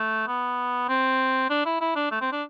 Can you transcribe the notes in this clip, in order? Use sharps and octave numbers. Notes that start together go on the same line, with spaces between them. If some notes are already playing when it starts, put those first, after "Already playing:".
Already playing: A3
B3
C4
D4
E4
E4
D4
A3
C4
D4